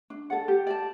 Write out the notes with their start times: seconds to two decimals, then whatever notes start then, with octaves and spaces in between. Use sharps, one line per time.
0.10 D4
0.30 A4 D5 F#5
0.48 G4
0.67 D5 A5